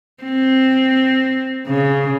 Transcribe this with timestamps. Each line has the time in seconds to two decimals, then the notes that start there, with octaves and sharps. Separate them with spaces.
0.24 C4
1.67 C#3